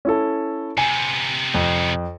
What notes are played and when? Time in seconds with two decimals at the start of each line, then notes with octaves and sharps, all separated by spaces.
0.05 C#4 E4 A4
0.78 C3 B3 G#5
1.54 F2